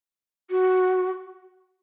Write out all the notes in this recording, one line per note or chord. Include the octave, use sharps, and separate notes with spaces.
F#4